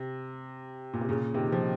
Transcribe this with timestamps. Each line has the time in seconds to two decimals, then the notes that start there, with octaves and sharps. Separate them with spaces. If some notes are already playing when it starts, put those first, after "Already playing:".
Already playing: C3
0.93 A#2
1.01 C3
1.09 A#2 C#3
1.34 C3 D#3
1.52 F3
1.60 D#3